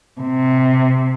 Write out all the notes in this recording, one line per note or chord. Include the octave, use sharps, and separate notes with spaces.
C3